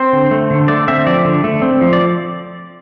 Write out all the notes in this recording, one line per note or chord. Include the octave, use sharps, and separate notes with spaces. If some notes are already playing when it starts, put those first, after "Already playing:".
Already playing: C4 C5
D3
A3
D3
A3 D5
C4 E5
F3 D5
D3
A3
C4
F3
D5